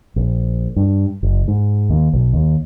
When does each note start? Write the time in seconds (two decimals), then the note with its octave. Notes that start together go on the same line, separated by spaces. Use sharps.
0.16 A#1
0.76 G2
1.23 F#1
1.48 G#2
1.90 D#2
2.13 B1
2.33 D#2